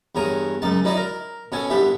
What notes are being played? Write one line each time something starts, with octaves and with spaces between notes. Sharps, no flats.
E2 G2 A#4 C#5 D#6
C#2 F#2 D#4 A5
F#3 D#4 E4 D5 D#5
A#4
B2 C#4 A4 G#5
C2 G2 B3 G4 E5